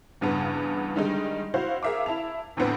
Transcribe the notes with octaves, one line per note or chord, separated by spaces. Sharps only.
E2 G2 C#3 B3
D3 D#3 G3 G#3 D#4
E4 F#4 C5 F5
G#4 A#4 E5 F5 D6
E4 E5 A5 F7
E2 A2 D3 B3 C4